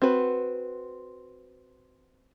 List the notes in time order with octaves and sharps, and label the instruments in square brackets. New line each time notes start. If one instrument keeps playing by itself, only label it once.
[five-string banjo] C4 F#4 B4